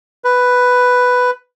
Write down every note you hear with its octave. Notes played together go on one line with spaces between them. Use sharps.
B4